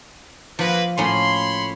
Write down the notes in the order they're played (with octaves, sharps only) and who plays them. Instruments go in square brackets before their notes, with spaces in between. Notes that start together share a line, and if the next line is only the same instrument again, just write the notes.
[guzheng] F3 [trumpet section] A#3 B4
[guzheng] A2 A#3 C#4 [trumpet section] C#5 B5 C6